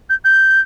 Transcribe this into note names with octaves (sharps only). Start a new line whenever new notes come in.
G6
G6